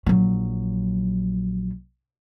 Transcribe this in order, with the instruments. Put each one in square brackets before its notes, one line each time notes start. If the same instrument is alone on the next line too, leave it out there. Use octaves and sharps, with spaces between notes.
[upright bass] A#1 F#3